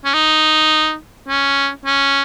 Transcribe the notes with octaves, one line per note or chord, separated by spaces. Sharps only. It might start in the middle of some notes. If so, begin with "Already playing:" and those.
C#4
D#4
C#4
C#4